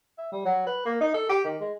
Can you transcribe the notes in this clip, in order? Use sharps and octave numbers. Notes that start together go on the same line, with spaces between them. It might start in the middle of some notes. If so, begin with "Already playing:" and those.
E5
G3
F#3
B4
A#3
D#4
A4
G4
D#3
G#3